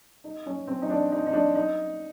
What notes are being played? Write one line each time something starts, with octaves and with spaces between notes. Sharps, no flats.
D#4
C#4
C4
D#4
D4
D#4
D#4
D4
D#4